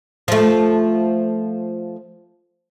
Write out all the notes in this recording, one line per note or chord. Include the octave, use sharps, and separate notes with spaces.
F3 A3